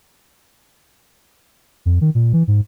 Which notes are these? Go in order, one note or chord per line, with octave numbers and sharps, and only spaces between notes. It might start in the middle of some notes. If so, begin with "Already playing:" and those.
F2
D#3
A#2
E3
G#2